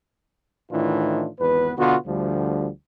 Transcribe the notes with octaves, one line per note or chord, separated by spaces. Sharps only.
A2 D#3 E3 D4 D#4 F4
G#1 E2 B3 B4
B2 D3 B3 F4 F#4
D2 D3 F3 G3